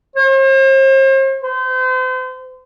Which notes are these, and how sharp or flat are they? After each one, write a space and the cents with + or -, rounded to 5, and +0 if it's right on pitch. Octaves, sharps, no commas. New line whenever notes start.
C5 +40
C5 -35